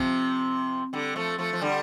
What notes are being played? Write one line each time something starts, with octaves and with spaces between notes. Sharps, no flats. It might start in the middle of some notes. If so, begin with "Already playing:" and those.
Already playing: C3 F3 C4
D3 G3
F3 A3
F3 A3
F3
D3 G3